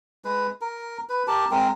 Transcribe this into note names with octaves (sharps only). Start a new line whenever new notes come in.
G#3 B4
A#4
B4
G4 A#4 A5
G#3 C4 A#4